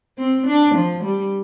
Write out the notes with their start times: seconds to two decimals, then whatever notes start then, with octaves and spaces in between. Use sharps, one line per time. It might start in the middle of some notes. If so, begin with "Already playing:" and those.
0.19 C4
0.47 D4
0.75 F3
1.04 G3